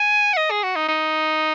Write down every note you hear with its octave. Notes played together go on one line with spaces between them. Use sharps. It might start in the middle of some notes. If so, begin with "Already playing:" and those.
Already playing: G#5
F#5
D#5
G#4
F#4
D#4
D#4